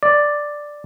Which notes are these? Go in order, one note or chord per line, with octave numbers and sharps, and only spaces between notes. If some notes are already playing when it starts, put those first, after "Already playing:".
D5